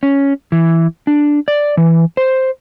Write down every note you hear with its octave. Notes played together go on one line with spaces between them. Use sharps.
C#4
E3
D4
D5
E3
C5